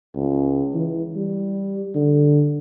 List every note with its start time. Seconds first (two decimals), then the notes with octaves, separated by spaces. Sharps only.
0.15 C#2
0.74 E3
1.16 G3
1.95 D3